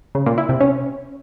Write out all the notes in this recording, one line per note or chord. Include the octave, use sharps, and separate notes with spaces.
C#3
A#2
E4
C3
C#4